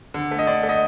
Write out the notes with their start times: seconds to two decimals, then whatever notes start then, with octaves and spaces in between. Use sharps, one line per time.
0.14 D3
0.31 A3
0.39 D#5
0.47 D3 D5
0.63 A3
0.69 D#5